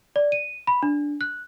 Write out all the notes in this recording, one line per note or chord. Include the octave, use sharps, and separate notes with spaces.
D5
D#7
B5
D4
F#6